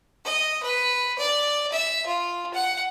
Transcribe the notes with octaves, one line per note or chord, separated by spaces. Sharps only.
D#5
B4
D5
E5
F4
F#5